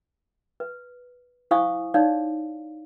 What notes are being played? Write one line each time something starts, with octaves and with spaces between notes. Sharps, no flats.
B4
E4 C5 F5 G#5 C#6 D#6
D#4 C#5 D5 F5